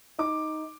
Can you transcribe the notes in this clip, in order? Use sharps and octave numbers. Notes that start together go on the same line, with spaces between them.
D#4 D6